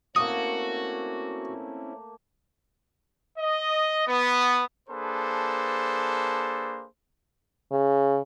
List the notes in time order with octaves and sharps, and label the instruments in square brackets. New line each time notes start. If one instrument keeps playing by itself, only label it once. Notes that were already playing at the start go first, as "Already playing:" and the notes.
[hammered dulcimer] A3 A#3 [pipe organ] C4 C#4 E4 [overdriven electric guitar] F#4 [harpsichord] D#6
[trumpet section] D#5
B3
A#3 D4 G#4 A4 B4 C5
[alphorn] C#3